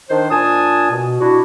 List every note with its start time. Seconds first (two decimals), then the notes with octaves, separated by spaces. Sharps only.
0.10 D#3 D4 C5
0.31 A#2 D4 G#5 A5 D#6
0.91 B2
1.20 D4 E4 F#4